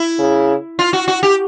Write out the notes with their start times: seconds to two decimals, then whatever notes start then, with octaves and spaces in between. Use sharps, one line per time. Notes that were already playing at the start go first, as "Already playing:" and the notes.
Already playing: E4
0.19 C#3
0.79 F4
0.93 F#4
1.08 F#4
1.23 G4